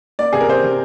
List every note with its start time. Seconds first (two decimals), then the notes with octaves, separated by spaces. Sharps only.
0.19 A#3 D5
0.33 C3 G#4
0.40 A#4
0.48 C3 C5
0.64 C3